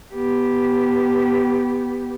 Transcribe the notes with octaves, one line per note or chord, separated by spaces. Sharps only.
B3 G4